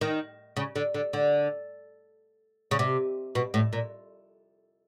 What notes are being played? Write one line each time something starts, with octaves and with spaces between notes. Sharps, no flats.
D#3
C#3
D3
D3
D3
C#3
C3
B2
A2
A#2